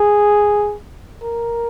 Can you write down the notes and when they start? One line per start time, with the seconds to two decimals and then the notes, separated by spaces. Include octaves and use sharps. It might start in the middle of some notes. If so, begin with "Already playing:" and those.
Already playing: G#4
1.22 A#4